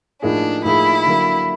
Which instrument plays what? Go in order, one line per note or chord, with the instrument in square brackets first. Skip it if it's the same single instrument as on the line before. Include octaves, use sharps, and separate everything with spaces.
[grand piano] A2 F3 A#3 D#4 G#4 [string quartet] D4
[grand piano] A2 F3 A#3 D#4 G#4 [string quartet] E4
[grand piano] D3 F#3 A#3